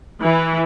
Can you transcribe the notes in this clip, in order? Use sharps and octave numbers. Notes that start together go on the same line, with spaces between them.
E3